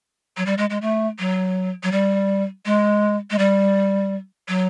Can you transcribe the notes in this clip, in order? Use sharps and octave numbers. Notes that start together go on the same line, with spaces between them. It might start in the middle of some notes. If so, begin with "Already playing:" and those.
F#3
G3
G#3
G#3
A3
F#3
F#3
G3
G#3
G#3
G3
F#3